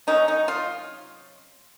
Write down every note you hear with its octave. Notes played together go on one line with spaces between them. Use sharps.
C3 F#3 C#4 D#4
D#4
F4